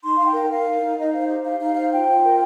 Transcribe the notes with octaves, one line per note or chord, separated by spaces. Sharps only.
D#4 C6
D#4 F5
G5
A#4
A#4 F5
D#4
D#4
D#4 D#5
C5 F5
G4
D#4 F5
D#4 F5
C5 F5
F4 G5
F4
A#4